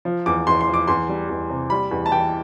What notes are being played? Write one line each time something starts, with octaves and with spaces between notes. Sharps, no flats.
F3
E2 D6
E2 C6
C6
F3
D6
E2 C6
G3
E2
C3
G3 B5
E2
A5
E3 G5